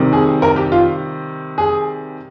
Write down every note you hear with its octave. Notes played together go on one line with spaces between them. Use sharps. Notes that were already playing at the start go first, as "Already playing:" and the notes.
Already playing: C3 D#3 G3
G#4
A#4
G4
F4
G#4